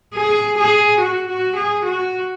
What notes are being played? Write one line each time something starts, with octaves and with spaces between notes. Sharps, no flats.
G#4
G#4
F#4
F#4
G#4
F#4